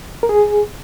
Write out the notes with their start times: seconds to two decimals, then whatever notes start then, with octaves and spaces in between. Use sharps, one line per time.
0.23 A#4
0.29 G#4